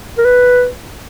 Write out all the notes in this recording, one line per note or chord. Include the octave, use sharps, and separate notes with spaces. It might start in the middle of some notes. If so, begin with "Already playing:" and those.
A#4
B4